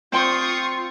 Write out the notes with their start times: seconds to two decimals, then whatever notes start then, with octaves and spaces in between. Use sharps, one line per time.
0.12 C4 F4 C5 G5 C6 C#6 D#6